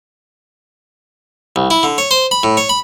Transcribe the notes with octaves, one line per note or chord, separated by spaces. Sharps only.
C2
E4
D3
C#5
C5
B5
A2
C#5
B5